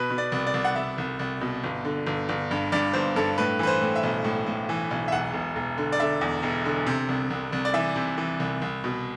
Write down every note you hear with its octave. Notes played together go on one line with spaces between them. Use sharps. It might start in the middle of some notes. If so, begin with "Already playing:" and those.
Already playing: B2 B4
B2
D5
C2
D5
C2
F#5
C2 E5
C2
C2
B2
G1
D3
G1
G1
G2
G2 D5
G1 C5
G2 A4
A2 B4
E3 B4
C5
A2
E5
B1
A2
A2
E3
B1
E5
E1 F#5
E1
E1
D3
D5
D3 E5
E2
E1
D3
C3
C2
C2
C2
D5
E3 E5
C3
E3
C2
C2
B2